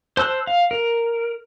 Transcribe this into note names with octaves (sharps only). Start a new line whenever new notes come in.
C5 A5 E6 F#6
F5
A#4